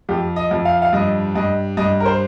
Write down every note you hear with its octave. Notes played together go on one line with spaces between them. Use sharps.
F2 G4
D#5
F2
F5
F5
G2 D#5
G2 D#5
G2 D#5
A#4
C5